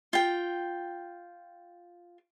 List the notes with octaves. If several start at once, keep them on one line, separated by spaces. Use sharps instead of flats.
F4 G5